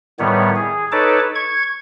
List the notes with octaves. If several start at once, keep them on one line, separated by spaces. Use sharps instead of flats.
A2 D#3 G3 B3 C#5
G#4
D#4 A4 B4 C#5 A5 D6
C#6 G#6